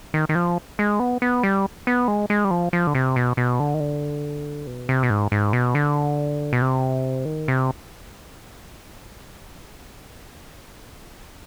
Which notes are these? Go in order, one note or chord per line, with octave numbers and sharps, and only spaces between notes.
D#3
D#3
F3
G#3
B3
B3
G3
B3
G#3
G#3
G3
F3
F3
D3
C3
B2
B2
D3
D#3
D3
B2
C3
B2
G#2
G#2
B2
D3
B2
C3
D#3
C3